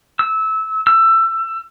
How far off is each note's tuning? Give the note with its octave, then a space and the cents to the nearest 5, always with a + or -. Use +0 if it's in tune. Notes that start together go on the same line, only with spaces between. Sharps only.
E6 -20
E6 +20